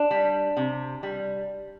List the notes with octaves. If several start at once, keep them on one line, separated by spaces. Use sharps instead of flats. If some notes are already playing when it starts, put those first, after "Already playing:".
Already playing: D4
G3
C3
G3